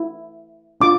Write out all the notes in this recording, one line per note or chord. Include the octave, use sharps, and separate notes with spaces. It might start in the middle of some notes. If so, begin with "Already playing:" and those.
Already playing: E4
D4 F4 D6